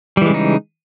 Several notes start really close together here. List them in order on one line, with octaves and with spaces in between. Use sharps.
G3 E3 G#3 C#3 D#4